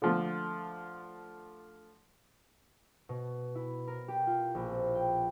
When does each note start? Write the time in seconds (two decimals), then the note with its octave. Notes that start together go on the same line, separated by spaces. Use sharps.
0.02 D3 F3 A3
3.09 B2
3.55 E4
3.87 A#4
4.08 G4
4.27 F4
4.55 A#1
4.70 C4
4.94 G5